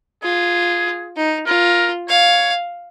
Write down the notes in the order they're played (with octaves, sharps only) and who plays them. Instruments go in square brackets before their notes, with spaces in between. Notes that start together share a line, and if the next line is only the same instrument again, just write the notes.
[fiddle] F4 [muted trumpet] G#4
[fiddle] D#4
[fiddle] F4 [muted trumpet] A#4
[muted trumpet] C#5 [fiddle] F5